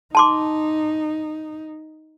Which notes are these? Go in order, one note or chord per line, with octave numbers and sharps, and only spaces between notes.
D#4 A5 C6 D6